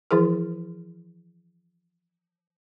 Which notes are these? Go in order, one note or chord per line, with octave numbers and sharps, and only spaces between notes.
E3 F3 E4 G#4 A#4